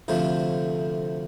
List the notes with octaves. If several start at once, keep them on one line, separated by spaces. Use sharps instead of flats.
D2 C3 F3 A3